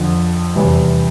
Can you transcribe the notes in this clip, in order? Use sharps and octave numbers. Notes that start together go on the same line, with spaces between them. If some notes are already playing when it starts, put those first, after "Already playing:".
Already playing: F2 D3 F3
E2 C3 E3 G3